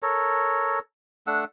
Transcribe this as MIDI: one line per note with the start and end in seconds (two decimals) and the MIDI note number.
0.02 0.79 69
0.02 0.79 70
0.02 0.79 73
1.27 1.44 57
1.27 1.44 62
1.27 1.44 78
1.27 1.44 88